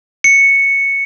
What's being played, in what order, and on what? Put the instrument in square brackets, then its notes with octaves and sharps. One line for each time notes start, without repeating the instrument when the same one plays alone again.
[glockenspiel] C#7